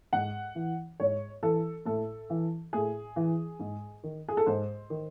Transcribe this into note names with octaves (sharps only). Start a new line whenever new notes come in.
G#2 F#5
E3
G#2 C#5
E3 A4
A2 A4
E3
A2 G#4
E3
G#2
D#3
G#4
A4
G#2 C5
D#3